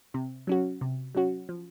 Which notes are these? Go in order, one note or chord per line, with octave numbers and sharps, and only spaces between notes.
C3
F#3 C#4 F#4
C3
F#3 C#4 F#4
F3